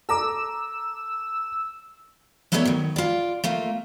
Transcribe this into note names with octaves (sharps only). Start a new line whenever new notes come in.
A4 A#5 D6 E6
F#3 A3 B3 A4 C#5 D5
D#3 F#3
F4 D5
A3 A#3 F4